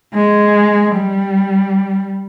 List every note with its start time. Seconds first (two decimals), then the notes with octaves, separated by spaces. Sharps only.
0.14 G#3
0.96 G3